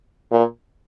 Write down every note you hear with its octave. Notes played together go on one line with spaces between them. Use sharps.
A#2